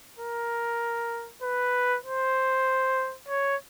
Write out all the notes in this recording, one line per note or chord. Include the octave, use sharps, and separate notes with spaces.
A#4
B4
C5
C#5